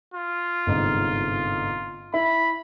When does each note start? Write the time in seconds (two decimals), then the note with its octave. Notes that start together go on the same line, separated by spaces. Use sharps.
0.14 F4
0.67 G1 G#2 C3
2.14 E4 B5